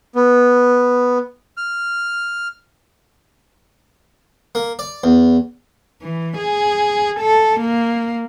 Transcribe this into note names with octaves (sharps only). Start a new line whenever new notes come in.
B3
F6
A#3
D5
E2
E3
G#4
A4
A#3